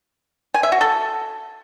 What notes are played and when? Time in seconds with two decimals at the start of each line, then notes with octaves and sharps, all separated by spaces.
0.54 G#5
0.63 E5
0.72 F#4
0.81 A4